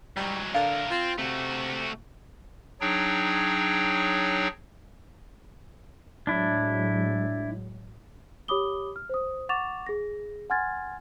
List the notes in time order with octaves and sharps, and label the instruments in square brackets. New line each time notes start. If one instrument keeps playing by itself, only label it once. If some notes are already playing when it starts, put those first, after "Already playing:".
[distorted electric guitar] G#2 F#3 [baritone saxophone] G3
[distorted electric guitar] A2 A#4 [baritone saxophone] D3 [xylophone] F5
[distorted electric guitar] C4 [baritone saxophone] F4
[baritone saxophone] C3 [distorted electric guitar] A3 F#4
[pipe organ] F#3 D4 D#4 G#4 C#5 G5
[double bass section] A2 F#3 G#3 [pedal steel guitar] D4 E4
[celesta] G4 C#5 B5 D6 D#6 G7
F6
C5 D#6
F#5 C#6 D6 A6 E7 F7
G#4 A#6
F#5 G#5 C6 F6 G#6 A6